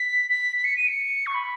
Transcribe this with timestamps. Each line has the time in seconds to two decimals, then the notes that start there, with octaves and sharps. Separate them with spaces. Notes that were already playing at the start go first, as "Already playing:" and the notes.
Already playing: B6
0.30 B6
0.57 B6
0.65 C#7
0.77 D#7
0.88 C#7
1.26 C#6
1.34 B5